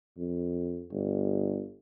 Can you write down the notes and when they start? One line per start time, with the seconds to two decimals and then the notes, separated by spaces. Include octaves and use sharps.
0.17 F2
0.92 G1